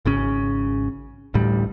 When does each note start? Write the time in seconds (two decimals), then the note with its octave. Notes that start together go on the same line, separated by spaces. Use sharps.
0.05 G#1 C#3 C#4
1.34 A1 D2 A2 G3